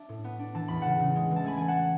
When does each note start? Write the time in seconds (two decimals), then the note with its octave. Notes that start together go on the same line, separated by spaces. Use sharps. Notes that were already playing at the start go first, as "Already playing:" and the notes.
Already playing: D4 E5
0.09 A2
0.24 B3
0.39 D4
0.54 E3 A5
0.68 E2 B5
0.82 C#3 F#5 A5
1.00 C#3
1.16 G#3
1.31 E3
1.36 A5
1.44 A3 G#5 B5
1.58 A3 G#5
1.68 F#5 A5